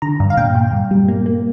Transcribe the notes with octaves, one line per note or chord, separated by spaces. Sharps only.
D3 A#5
G2
F5
A#2 G5
A#2
G2
G3
A#3
A#3